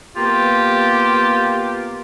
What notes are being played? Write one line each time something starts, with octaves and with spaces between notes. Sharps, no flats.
A#3 B3 F4 G4